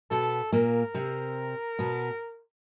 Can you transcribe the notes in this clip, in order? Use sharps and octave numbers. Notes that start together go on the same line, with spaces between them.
B2 B3 A4
A#2 A#3 A#4
C3 C4
B2 B3